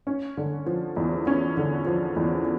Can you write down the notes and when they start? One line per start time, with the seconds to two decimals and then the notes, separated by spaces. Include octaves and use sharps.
0.07 C#4
0.37 D3
0.67 F3
0.96 E2
1.27 C#4
1.57 D3
1.87 F3
2.16 E2